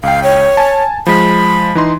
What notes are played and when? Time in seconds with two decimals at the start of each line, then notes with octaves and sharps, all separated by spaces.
0.03 C#2 F5 G5
0.23 C#5
0.57 G#5 A5
1.07 F3 G#3 B5
1.75 E3 D#4 C6